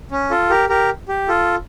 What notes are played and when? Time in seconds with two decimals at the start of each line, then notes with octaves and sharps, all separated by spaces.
0.11 C#4
0.30 F4 A4
0.50 G4 A#4
0.69 G4 A#4
1.09 G4
1.28 F4 A4